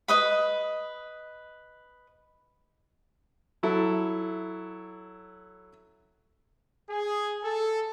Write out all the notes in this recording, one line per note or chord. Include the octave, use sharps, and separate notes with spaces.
B4 D#5 B5
F#3 E4 A4
G#4
A4